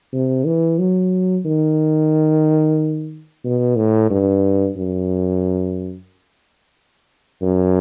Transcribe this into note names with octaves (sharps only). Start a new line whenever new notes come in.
C3
E3
F#3
D#3
B2
A2
G2
F#2
F#2